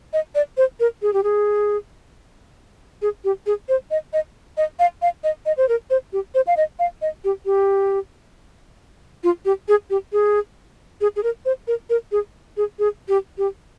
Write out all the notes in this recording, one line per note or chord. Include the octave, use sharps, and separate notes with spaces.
D#5
D5
C5
A#4
G#4
G4
G#4
G#4
G4
G#4
C5
D#5
D#5
D#5
F5
F5
D#5
D#5
C5
A#4
C5
G4
C5
F5
D#5
F5
D#5
G4
G4
F4
G4
G#4
G4
G#4
G#4
G#4
A#4
C5
A#4
A#4
G#4
G#4
G#4
G4
G4